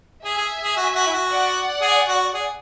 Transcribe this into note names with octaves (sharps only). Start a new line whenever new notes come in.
G#4 E5 G#5
G#4
G#4
F#4
F#4
E4
F#4
D5 F#5
G#4
F#4
G#4